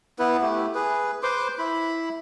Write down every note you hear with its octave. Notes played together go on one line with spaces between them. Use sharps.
B3 E4 B4
A3 E4 G4
G#4 B4
B4 C5 C6 D6
E4 B5